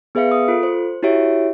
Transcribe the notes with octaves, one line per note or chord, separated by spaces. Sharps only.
B3 G#4 B4 E5 F5 C#7
D#6
F4 A4
C5
E4 F#4 G4 C#5 E5 D7